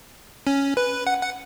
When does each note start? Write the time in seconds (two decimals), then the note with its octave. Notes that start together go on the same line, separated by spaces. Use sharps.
0.47 C#4
0.77 B4
1.07 F#5
1.23 F#5